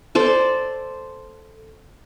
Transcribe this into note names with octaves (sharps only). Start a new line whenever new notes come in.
A4 C5 D5